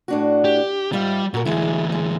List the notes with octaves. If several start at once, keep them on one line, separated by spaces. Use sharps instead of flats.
A2 D4 F#4
G4
G#2 G3 F4 E5
A#2 F#4 A#4
D2 E3 G#3 E4
G#3